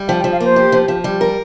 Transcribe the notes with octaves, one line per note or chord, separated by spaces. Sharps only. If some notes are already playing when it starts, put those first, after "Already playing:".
Already playing: G3
F3 G5
G5
F3
F5
A#3 C5
G4
F3
F3
G3
A#4